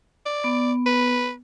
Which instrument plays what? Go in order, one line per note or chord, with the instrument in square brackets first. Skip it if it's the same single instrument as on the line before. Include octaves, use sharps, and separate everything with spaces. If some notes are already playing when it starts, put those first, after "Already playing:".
[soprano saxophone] D5
[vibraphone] B3
[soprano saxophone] B4